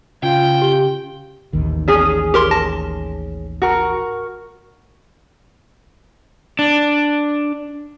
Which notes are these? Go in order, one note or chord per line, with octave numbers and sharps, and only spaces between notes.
C#3 F4 G5
G4 G7
A1 D#2 D#3
C#4 G#4
G4 A#4 C6
A5 A#6
F#4 A#4
D4